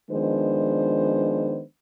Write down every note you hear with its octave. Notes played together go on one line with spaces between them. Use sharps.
D#3 F3 G#3 B3 D4 C5